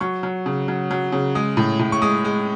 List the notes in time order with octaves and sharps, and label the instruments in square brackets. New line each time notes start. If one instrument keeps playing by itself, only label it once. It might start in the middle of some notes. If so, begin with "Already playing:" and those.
[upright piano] F#3 C#6
F#3
C#3
F#3
F#3
C#3
G#3 D#6
A2
A2
C#6
G#3 D#6
G#3